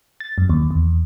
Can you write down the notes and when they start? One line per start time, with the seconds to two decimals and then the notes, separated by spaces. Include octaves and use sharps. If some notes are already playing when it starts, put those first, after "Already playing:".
0.20 A6
0.38 F#2
0.50 D#2
0.71 E2